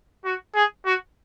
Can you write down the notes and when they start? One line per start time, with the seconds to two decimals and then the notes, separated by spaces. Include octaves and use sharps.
0.25 F#4
0.55 G#4
0.86 F#4